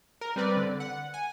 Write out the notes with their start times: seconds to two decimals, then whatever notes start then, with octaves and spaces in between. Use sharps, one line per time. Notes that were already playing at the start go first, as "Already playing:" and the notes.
0.21 A#4
0.36 G3 C4 B4 D5
0.57 D3
0.80 F#5
1.14 G#5